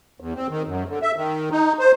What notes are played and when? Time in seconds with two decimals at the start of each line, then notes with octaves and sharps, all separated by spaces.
0.20 E2
0.35 C4
0.50 D#3
0.67 F#2
0.89 D3
1.02 E5
1.16 D#3
1.52 D#4
1.79 C5